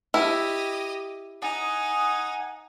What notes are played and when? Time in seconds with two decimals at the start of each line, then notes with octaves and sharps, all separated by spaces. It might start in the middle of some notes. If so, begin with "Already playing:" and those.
0.14 E4 G4 D#5
1.42 D#4 F#5 G#5 D#6